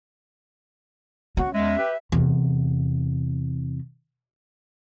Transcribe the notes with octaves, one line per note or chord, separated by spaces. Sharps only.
C#4 F#4
E2 G#3 E5
G4 B4
E2 C3